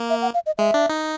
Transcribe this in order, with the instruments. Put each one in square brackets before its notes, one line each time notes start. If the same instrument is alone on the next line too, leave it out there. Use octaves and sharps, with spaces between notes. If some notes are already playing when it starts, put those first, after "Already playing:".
Already playing: [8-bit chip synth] A#3
[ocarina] E5
F#5
F5
D#5
[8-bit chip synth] G#3 [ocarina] E5
[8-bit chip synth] D4
D#4